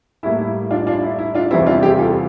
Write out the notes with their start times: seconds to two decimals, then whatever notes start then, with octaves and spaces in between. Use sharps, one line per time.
0.23 A2 G3 A#3 E4
0.39 E4
0.71 D4 F4
0.87 D4 F4
1.03 E4
1.19 E4
1.35 D4 F4
1.51 E2 C3 E3 G3 C4 E4
1.67 D4 F4
1.82 E4 G4
1.98 F4 A4